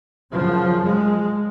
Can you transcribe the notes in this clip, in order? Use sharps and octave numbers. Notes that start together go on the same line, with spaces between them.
F#2 C#3 F3
G#3